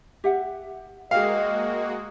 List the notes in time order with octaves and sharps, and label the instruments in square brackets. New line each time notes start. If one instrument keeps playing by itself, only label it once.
[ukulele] G4 E5 F#5
[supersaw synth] G#3 A#3 F#4 [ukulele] G#4 G5 [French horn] D#5 [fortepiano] F5